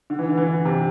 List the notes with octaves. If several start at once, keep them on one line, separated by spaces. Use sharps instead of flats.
D3
E3
D3
E3
D3
C3